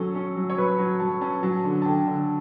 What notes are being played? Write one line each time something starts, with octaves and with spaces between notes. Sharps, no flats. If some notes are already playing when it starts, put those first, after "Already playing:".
Already playing: F#3 C#4 A4
C#4
F#3
C#5
F#3 B4
F#3
F#3 A5
C#4 A5
F#3 A5
D3
A5
D3 G5
D3